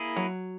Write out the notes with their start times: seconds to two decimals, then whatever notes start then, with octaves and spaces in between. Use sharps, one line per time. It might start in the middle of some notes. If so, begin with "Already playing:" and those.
Already playing: A#3 E4 G#4
0.16 F#3